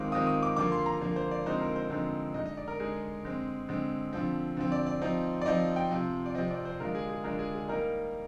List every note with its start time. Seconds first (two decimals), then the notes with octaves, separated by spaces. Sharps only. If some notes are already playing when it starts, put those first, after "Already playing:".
Already playing: D#3 G#3 C4 F4 D6
0.12 D#3 G#3 C4 F4 D#6
0.27 D#6
0.43 D6
0.56 D3 F3 A#3 D6
0.72 C6
0.86 A#5
1.01 D3 F3 A#3
1.16 C5
1.31 D5
1.46 D3 F3 G#3 C4 D#4 C5
1.61 A#4
1.76 C5
1.90 D3 F3 G#3 C4 D#4
2.34 D3 G#3 D#4 D#5
2.46 D#5
2.57 D5
2.68 A#4
2.79 D3 G#3 D#4 G#4
3.24 D3 G#3 C4
3.69 D3 G#3 C4
4.13 D3 F3 C4
4.57 D3 F3 C4
4.72 D5
4.87 D5
5.01 F3 C4 D#4
5.41 D5
5.46 F3 C4 D#4 D#5
5.76 G5
5.91 C3 F3 C4
6.26 D5
6.35 C3 F3 C4 D#5
6.51 D5
6.65 C5
6.80 D3 G#3 D4 F4 A#4
6.95 G#4
7.10 G#4
7.24 D3 G#3 D4 F4 A#4
7.39 G#4
7.54 G#4
7.68 G3 A#3 D#4 A#4